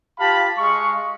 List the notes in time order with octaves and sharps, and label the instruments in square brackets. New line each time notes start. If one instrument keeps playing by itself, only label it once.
[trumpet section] F4 G4 F5 A5 B5
G#3 F5 C#6